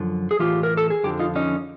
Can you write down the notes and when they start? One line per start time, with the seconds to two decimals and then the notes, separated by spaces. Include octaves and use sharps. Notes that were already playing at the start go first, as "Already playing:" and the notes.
Already playing: F#2 D3 F3
0.31 G#4
0.39 A2 E3 F4 G4
0.63 A#4
0.77 A4
0.90 G#4
1.04 F2 D3 F3 G4
1.19 D#4 F4
1.36 C#4 D#4